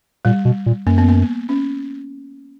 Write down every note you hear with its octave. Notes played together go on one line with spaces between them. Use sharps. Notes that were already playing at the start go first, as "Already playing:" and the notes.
A#2 G3
B2
A#2
F#2 A#3
B3
A#3
C#4